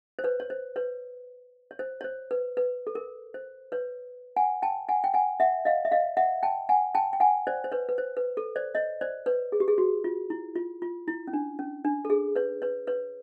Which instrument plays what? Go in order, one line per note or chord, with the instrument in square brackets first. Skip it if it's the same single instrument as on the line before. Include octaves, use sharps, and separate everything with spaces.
[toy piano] C5
B4 C#5
C#5
C5
B4 C#5
C#5
C5
C#5
C5
B4
B4
A4
A#4
C5
B4 C#5
F#5 G#5
G5 A5
F#5 G#5
G5
F#5 G#5
E5 F#5
D#5 F5
E5
D#5 F5
E5 F#5
G5 A5
F#5 G#5
G5 A5
G5
F#5 G#5
C5 D5
C5
B4 C#5
B4
C5
B4
A4
C5 D5
C#5 D#5
C5 D5
B4 C#5
G#4
G4
G#4
F#4
F4
E4
F4
F4
E4
C#4
D4
C#4
D4
A4
G#4
B4 C#5
B4 C#5
B4 C#5